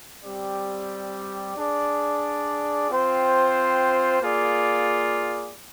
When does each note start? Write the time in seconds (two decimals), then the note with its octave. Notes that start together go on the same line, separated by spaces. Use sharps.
0.23 G3 C4 G4 D5
1.55 D4 G#4 D5
2.88 C4 F4 C5 G5
4.21 A#3 F4 G#4 D5